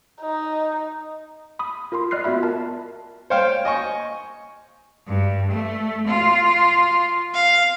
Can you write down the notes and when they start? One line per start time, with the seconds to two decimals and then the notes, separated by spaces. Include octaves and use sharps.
0.22 D#4
1.59 B5 D#6
1.92 F4 A#4 B5 C6
2.11 D5 D#5 F6 F#6 C7
2.24 B3 F4 F#4 E5 B5
2.43 A#4 A5
3.30 C5 C#5 F5 G5
3.65 D#5 G#5 C#6
5.06 G2
5.50 A3
6.06 F4
7.34 F5